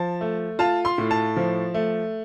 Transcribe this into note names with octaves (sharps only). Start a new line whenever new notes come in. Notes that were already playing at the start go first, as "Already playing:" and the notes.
Already playing: F3 A5
A3
F4 A5
C6
A2
A5
F3
A3